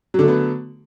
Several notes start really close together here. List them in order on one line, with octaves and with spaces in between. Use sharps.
F#3 D3 A3 B3